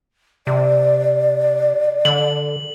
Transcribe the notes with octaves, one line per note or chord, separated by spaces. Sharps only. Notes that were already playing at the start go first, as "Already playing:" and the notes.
C3 D5
D3 F#7